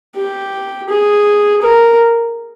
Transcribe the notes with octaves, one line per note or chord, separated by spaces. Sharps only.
G4
G#4
A#4